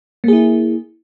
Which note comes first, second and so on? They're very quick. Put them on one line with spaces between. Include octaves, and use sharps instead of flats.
A#3 G#4 E4